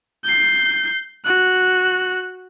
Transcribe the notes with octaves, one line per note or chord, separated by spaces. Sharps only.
G6 C7
F#4 F#6